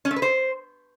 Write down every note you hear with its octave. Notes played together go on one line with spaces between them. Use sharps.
C#4
A3
B4
C5